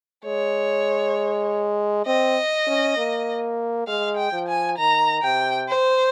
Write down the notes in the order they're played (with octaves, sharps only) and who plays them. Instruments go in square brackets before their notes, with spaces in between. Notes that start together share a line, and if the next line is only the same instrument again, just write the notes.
[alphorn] G#3 [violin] C#5
[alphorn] C4 [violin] D#5
[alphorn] C#4
A#3
[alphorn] G#3 [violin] F5
[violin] G5
[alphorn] F3
[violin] G#5
[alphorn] D#3 [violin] A#5
[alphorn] C3 [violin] G5
[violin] C5